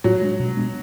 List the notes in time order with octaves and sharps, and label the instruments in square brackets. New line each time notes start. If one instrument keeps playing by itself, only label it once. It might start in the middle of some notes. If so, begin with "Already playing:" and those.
[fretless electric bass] A2 [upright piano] F#3
[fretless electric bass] G#3 D4
B2
G#3 B3 D4